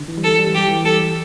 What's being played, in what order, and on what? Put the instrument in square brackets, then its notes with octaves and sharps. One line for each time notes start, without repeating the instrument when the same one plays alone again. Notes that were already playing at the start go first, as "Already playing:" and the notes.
Already playing: [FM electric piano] D3
E3
G3
[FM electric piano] E3 [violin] A4
[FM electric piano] G3
E3
[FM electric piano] G3 [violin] G4
[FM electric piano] E3
[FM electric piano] G3 [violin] A4